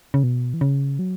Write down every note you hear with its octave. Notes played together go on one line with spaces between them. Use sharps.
C#3
B2
E3
C#3
F#3